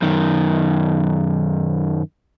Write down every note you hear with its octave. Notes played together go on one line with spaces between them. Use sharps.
F#2 D#3